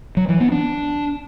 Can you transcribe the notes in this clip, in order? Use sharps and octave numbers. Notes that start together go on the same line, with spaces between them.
F#3
E3
B3
D4